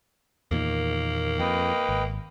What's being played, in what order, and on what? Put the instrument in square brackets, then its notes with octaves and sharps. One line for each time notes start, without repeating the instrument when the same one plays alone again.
[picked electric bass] E2 A#2 D#3 [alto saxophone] A#3
[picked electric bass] F2 [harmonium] B4 D#5 G5
[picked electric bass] G#1